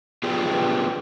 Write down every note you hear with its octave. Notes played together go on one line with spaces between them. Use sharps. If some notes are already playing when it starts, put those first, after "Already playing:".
B3 D4 F4 G4 G#4 B4